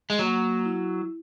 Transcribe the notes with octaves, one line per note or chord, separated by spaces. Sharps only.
G#3
F#3 A#3
E4